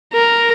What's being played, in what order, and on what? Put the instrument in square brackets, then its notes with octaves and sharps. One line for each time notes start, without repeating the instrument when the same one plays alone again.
[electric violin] A#4